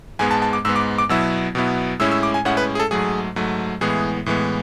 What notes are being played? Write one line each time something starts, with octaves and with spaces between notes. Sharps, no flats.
G#2 G#3 B3 G#5
A5
A5
D6
G#2 G#3 B3 E6
D6
D6
B2 F#3 B3 E4 E6
B2 F#3 B3 E4
A2 G#3 C#4 E4 E6
E6
D6
G#5
A2 G#3 C#4 E4 F#5
B4
G#4
A4
G#2 F#3 A3 G#4
G#2 F#3 A3
A2 E3 G#3 B3 G#4
A2 E3 G#3 B3